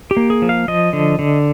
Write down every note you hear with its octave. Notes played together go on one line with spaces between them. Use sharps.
G4
A#3
G#4
F3
F5
F3 D#5
D3
D3